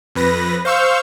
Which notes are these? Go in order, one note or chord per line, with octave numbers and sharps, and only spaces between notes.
F2 B4 A#6
C5 F5 C#6 E6 G6